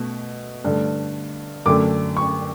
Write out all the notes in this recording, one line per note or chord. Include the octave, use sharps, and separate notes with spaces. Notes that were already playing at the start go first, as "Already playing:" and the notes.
Already playing: B2 A3
G2 D3 A3
F#2 D3 A3 D6
C#6